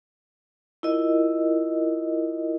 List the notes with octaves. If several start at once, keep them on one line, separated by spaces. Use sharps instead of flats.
E4 F4 A#4 D#5